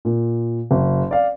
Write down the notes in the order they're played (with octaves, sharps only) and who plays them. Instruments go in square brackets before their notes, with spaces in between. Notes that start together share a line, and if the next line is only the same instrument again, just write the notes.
[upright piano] A#2
F#1
D5 F5